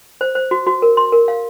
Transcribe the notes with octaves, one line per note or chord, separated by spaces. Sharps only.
C5
C5
F#4
F#4
A#4
C6
A#4
F5